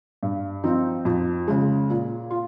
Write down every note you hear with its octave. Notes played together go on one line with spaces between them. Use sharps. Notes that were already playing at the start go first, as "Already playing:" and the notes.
G2
F3 C4 D#4
F2
C#3 G#3
A#2
F4